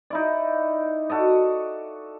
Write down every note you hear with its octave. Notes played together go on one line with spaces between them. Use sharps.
D#4 E4 D5
F#4 A4 D5 D#5